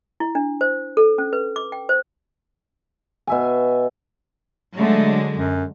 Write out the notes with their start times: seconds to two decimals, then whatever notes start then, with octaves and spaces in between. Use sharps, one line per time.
0.20 E4
0.35 D4
0.61 C5
0.97 A4
1.18 C#4
1.33 B4
1.56 D6
1.72 G5
1.89 C5
3.27 B2 E5 G#5
4.77 D3 F#3 G#3 A3
5.37 F#2